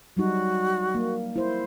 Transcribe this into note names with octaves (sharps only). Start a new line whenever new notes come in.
F#3 G3 D#4 F#4
A#3
E4 C5